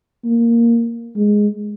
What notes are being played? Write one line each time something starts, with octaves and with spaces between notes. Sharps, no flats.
A#3
G#3